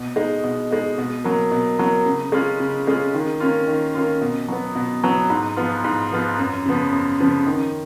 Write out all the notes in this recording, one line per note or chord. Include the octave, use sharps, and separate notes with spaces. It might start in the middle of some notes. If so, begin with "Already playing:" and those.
Already playing: B2
G#3 D#4
B2
G#3 D#4
B2
F#3 A#3
B2
F#3 A#3
C#3
G#3 C#4 F4
C#3
G#3 C#4 F4
D#3
A#3 C#4 F4
D#3
A#3 C#4 F4
B2
F#3 B3
B2
F#3 B3
G#2
F3 B3 F4
G#2
F3 B3 F4
F#2
C#3 F3 B3
F#2
C#3 F3 B3
D#3